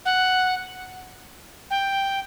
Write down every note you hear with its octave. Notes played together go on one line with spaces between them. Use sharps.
F#5
G5